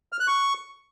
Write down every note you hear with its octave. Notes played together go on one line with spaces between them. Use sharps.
F6
F#6
C#6